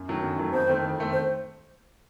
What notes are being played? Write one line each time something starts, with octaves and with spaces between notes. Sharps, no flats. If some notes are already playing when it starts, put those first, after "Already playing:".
Already playing: F#2
D#3 F#3 A3
F#2
D#3 F#3 A3
F2 C5
D#3 A3 C4
F2
D#3 A3 C4
C5